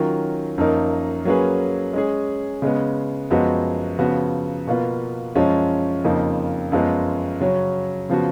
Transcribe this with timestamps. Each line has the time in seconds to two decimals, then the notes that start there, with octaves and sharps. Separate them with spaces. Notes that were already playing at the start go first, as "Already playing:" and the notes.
Already playing: D#3 F#3 C#4 F4 A#4
0.58 F#2 F3 A#3 D#4 A#4
1.25 F#3 A#3 C#4 G#4 B4
1.93 G#3 C#4 G#4
2.62 C#3 G#3 B3
3.30 F#2 F3 G#3 B3 F#4
3.99 C#3 F3 B3 F#4
4.67 B2 A#3 F4 B4
5.35 F#2 F3 G#3 C#4 F4
6.04 F2 C#3 F3 A#3 D#4
6.72 F#2 F3 G#3 B3 F4
7.41 C#3 F#3 C#4
8.09 C#3 F3 B3 F#4